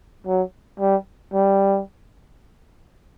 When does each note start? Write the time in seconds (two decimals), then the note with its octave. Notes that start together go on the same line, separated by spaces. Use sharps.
0.26 F#3
0.80 G3
1.34 G3